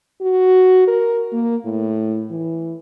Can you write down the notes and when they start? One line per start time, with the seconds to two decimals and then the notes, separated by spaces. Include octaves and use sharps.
0.21 F#4
0.88 A#4
1.33 A#3
1.65 A2
2.30 E3